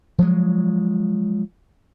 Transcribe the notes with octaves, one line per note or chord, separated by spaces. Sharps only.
F3 F#3 G#3